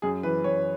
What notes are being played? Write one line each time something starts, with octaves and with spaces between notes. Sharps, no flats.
F#2 G#4
E3 B4
F#2 C#5